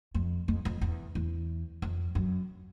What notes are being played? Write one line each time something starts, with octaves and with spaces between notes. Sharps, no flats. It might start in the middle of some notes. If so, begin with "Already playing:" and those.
F2
F2
F2
E2
E2
F2
F#2